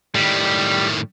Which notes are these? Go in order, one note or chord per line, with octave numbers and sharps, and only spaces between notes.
A2 D#3 G3